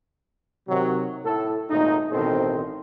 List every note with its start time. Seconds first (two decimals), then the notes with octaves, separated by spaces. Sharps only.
0.68 C3 D#3 F#3
1.24 A2 A4
1.69 G#1 A#2 A3 D#4
2.11 A1 B2 D#3 C4 A4 C5